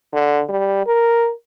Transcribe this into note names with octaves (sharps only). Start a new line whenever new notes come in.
D3
G3
A#4